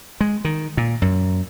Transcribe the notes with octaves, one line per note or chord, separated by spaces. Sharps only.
G#3
D#3
A#2
F#2